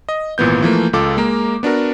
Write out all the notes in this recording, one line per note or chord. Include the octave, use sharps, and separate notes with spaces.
D#5
G#1 A#2 E3 B3 G6
E3 F3 A3 A#3
C#2 F4 A4 D6
G#3 A#3 A#5
B3 D4 F#4 A#4